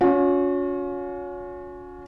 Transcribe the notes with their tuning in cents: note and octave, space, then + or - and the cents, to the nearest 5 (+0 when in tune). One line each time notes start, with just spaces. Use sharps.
C#4 +25 F#4 -45